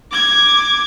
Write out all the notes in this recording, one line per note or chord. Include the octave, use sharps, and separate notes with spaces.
D6 G#6